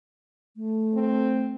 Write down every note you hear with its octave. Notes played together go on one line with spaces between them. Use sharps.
A3
C4